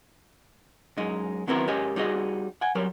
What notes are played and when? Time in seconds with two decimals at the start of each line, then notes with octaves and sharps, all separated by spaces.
0.97 F#2 G#3 D#4
1.47 D#3 F#3 B3 C4 E4 A#4
1.67 G#2 C#4 G4 A#4 D#5 G#5
1.96 G3 D#4 F#4 G#4 D#5
2.61 F#5 G#5
2.75 F#3 G3 A#4 C#5